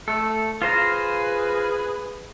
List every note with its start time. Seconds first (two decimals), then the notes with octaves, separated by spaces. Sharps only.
0.08 A3 A4
0.62 F4 G#4 B4 C5 A#5